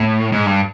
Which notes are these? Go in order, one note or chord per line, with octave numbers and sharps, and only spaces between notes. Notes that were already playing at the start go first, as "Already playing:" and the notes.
Already playing: A2
G#2
G2